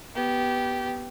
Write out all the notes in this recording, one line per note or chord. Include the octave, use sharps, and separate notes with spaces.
B3 G4